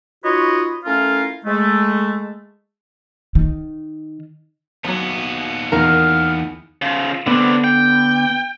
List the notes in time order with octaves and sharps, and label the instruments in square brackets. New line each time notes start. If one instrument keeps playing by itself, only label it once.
[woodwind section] D#4 F4 F#4 B4 C#5 D#5
A3 C#4 E4 F4 A#4 F5
G#3 A3
[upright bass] D#3
[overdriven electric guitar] D#2 B3 [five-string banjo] F3 F#3
[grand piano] E2 D#3 [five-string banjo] A#4 [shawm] F5
[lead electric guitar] C#3 F3
[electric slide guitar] D3 B3 B4 [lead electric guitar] C4 D4
[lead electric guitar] G5